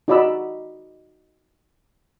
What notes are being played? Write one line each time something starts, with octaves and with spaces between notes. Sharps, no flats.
D#4 F#4 D5 D#5 B5 E6